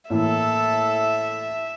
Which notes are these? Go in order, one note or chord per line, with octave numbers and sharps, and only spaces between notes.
A2 E3 A#3 A4 E5